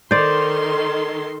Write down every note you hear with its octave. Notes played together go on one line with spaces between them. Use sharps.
D#3 A4 C5 D5 C6